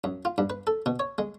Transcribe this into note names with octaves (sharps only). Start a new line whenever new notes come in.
F#2
F4
G2
B4
A4
B2
C#5
G#3